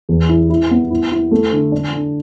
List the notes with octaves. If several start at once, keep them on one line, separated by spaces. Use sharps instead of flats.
E2
E4
E4
B3
E4
E4
A3
D3
D4
D3